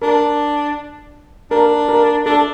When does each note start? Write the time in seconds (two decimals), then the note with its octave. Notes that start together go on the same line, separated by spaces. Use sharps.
0.02 D4 A#4
1.51 D4 A#4
1.89 A#4
2.26 D4 A4